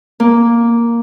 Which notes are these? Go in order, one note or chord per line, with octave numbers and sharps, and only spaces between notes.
A#3